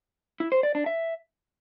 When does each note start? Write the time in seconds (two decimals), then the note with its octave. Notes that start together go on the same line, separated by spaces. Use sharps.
0.40 E4
0.52 C5
0.63 D5
0.75 D4
0.86 E5